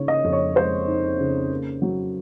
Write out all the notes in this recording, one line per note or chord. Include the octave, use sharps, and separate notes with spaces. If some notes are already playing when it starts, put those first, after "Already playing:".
Already playing: C#3 D#4 C#5
D#5
F2
C#5
G#3 C5
D#4
C#3
A#3
F#3